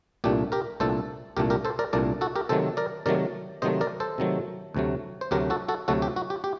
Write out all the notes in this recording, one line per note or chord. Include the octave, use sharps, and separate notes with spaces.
C2 A#2 A3 D4 G4
G4 A#4
C2 A#2 A3 D4 A4 C5
C2 A#2 A3 D4 G4 A#4
G4 A#4
A4 C5
A#4 D5
C2 A#2 A3 D4 A#4 D5
F#4 A4
G4 A#4
C3 D#3 F#3 A3 A4 C5
A#4 D5
C3 D#3 F#3 A3 A#4 D5
C3 D#3 F#3 A3 C5 D#5
A#4 D5
A4 C5
C3 D#3 F#3 A3
D2 C3 F#3 A3
C5
D2 C3 F#3 A3 G4 A#4
F#4 A4
F#4 A4
D2 C3 F#3 A3 F#4 A4
G4
F#4
G4
G4